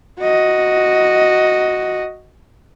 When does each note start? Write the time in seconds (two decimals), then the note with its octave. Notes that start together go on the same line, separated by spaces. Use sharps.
0.20 F#4 D#5